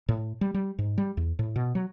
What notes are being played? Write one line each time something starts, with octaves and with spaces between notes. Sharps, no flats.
A2
G3
G3
G#2
G3
E2
A2
B2
F#3